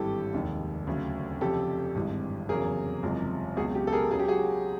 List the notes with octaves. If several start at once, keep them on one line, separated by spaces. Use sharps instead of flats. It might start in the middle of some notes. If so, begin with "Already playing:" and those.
Already playing: G#1 G2 E3 G3 G4 A4
F1 D#2 D#3 G#3
D2 C#3 F#3
F1 F2 C#3 G4 A4
G#1 G2 E3 G#3
F1 E2 C#3 F#3 G#4 A#4
F#1 E2 C3 F3 G#3
C#2 B2 F#3 F#4 G#4
G4
A4
G#4 A#4
C#2 C#3 F#3 G#4
G4
F#4 G#4